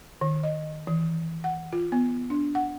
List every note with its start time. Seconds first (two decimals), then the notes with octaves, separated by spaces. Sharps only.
0.21 D#3
0.43 D#5
0.87 E3
1.44 F#5
1.73 F4
1.92 B3
2.30 D4
2.55 F#5